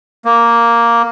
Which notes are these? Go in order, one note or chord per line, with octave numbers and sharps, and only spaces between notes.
A#3